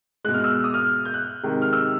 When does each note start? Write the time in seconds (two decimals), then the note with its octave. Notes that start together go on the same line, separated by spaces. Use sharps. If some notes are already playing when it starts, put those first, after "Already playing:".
0.24 B2 G#3 F#6
0.34 F6
0.44 E6
0.64 D#6
0.74 F6
1.05 G6
1.14 F#6
1.43 C3 D#3 G#3
1.62 F6
1.73 E6